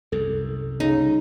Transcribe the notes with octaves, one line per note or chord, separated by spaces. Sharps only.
C2 F#2 A4
C#3 D#4